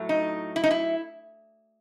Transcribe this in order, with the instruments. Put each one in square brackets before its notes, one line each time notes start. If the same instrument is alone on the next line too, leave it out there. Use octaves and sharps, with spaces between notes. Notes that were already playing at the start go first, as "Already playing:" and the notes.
Already playing: [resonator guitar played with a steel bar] A2 F#3 A3
D#4
E4
D#4
E4